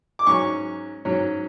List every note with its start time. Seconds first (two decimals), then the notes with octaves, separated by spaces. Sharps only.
0.19 D6
0.27 G#2 F#3 C#4 C#6
1.05 G#2 F#3 C#4